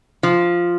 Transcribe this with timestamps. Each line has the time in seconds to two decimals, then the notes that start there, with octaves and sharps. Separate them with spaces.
0.23 F3